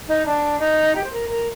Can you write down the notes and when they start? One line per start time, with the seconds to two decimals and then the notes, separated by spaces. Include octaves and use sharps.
0.08 D#4
0.26 D4
0.60 D#4
0.95 G4
1.04 C5
1.12 A#4
1.29 A#4